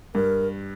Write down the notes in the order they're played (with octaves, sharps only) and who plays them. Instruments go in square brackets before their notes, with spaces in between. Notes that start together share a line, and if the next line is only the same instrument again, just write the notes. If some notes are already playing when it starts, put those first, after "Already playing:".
[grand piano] G2 [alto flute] A#4